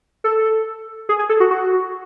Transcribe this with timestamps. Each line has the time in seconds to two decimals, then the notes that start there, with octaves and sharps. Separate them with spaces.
0.24 A4
1.09 G#4
1.19 G#4
1.29 A4
1.40 F#4
1.51 F#4